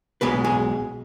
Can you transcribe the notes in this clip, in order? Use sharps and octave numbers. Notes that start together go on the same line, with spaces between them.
B1 B2 G#3 B4
G#4